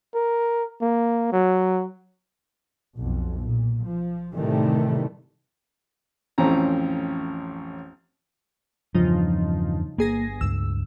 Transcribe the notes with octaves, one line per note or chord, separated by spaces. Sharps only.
A#4
A#3
F#3
B1 F2
A#2
F3
A2 C3 D#3 E3 G3 A3
A1 F2 C4 C#4 A#5
E2 G2 C#3 F3 D#4
G1 A#3 G#4 A#6
C#2 G2 E6